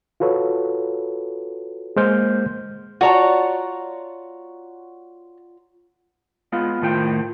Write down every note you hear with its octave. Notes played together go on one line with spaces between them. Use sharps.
F4 F#4 A4 B4 C#5
G#3 A#3 C5 F6 G6
F4 F#4 C#5 D5 A5 A#5
G#3 B3 F4
A2 D#3 A3 F4 C5 G5